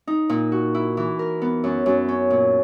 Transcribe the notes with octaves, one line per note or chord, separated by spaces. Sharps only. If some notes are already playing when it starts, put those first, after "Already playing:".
D#4
A#2
F#4
E4
E3
A#4
B3
F#2
F#2
C#4
A#2